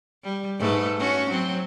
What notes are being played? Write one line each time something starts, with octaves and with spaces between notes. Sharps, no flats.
G3
G#2 A3 B4
C#4 F#4
F#3 C4